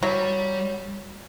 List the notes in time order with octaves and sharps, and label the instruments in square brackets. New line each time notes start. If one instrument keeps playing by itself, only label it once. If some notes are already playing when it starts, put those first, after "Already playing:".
[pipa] F#3 [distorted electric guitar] G3